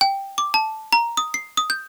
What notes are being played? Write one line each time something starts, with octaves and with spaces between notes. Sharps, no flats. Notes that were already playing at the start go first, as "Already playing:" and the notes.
G5
D6
A5
A#5
D#6
C7
D#6
G6